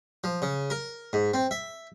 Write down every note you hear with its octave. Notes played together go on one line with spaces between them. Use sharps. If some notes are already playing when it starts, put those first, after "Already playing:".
F3
C#3
A#4
G#2
C4
E5